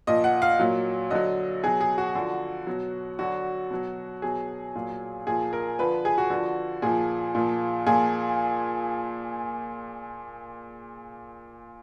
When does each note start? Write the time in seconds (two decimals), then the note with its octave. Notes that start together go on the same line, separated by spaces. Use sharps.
0.07 A#2 F3 D#5
0.24 F#5
0.42 F5
0.59 A#2 F#3
1.11 D3 F#3 D#5
1.63 B2 F#3 G#4
1.81 G#4
1.98 F#4
2.15 D3 F3
2.67 B2 F#3
3.19 D3 F#3 F#4
3.70 B2 F#3
4.22 B2 F#3 G#4
4.75 A#2 F#3
5.27 A#2 F3 G#4
5.53 A#4
5.79 D3 F3 B4
6.05 G#4
6.18 F#4
6.30 D3 F3
6.82 A#2 F3 G#4
7.35 A#2 F3
7.86 A#2 F3 G#4